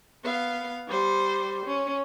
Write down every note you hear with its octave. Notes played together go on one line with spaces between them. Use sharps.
B3 F5
G3 C5
C#4